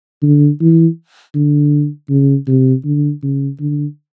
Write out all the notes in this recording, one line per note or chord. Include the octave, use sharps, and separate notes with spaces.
D3
E3
D3
C#3
C3
D3
C#3
D3